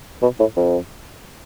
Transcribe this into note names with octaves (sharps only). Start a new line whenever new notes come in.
B2
A2
F2